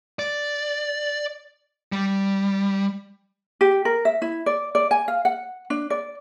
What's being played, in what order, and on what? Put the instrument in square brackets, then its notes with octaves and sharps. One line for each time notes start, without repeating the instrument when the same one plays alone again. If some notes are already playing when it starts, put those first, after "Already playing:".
[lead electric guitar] D5
G3
[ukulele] G4
A#4
E5
E4
D5
D5
G#5
F5
F#5
D4
D5